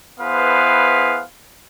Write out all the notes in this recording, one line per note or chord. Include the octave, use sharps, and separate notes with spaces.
B3 E4 G#4 B4 C5 F5